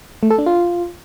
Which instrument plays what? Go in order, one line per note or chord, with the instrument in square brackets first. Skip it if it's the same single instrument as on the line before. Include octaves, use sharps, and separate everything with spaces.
[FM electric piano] A3
A4
D4
F4